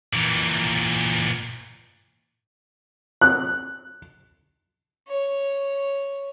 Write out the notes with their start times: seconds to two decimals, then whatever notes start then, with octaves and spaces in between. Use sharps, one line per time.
0.13 A#2 E3
3.21 F#6
5.08 C#5